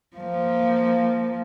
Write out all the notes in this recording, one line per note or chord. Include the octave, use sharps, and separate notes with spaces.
F3 A#3